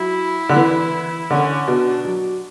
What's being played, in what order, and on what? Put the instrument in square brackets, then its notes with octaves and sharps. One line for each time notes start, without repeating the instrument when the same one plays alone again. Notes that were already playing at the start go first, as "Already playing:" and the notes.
Already playing: [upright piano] F#3 [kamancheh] E4
[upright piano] D3
E3
[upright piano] D3 [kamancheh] C#4
[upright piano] B2 [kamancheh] D4
[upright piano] F#3